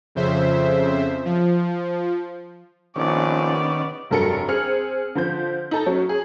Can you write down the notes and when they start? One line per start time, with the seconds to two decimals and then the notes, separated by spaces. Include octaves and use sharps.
0.15 F2 C#3 C5 E5
1.25 F3
2.96 A#1 D#3 B3 C#4 D5
4.10 F1 G2 F#3 A4 A#4 C#7
4.48 C4 G#4 F6 C#7
5.15 D3 F3 C5 G6
5.71 D#4 A4 A5
5.86 F#3 C#4
6.09 G#4